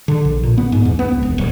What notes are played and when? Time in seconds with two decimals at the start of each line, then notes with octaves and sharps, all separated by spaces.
0.08 D3
0.25 A#1
0.43 A#2
0.58 B3
0.72 G#2
0.85 E2
0.99 B3
1.11 C#2
1.23 E1
1.38 D1